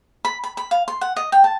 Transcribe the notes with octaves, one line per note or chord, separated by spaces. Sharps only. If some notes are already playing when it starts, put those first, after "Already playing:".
B5
B5
B5
F5
C6
F#5
D#5
G5
A5